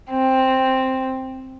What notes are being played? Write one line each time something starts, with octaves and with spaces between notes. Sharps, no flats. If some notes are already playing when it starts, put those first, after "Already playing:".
C4